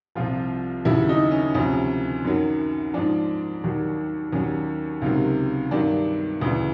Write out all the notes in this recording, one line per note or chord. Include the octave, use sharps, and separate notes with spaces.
C2 C3 F3 F4
D#2 C#3 F#3 E4
D#4
C#4
D2 C3 F3 C#4
F#2 D#3 F#3
G#2 F3 D4
D#2 D#3 F#3
D#2 D#3 F#3 C#4
C#2 C3 D#3 F#3
G2 D#3 F#3 D4
D2 C#3 E3